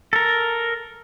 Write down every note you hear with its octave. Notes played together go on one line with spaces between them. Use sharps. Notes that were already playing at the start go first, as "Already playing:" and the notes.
A4 A#4